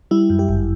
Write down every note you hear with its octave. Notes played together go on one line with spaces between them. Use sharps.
G3 E4
F#2
G4
G1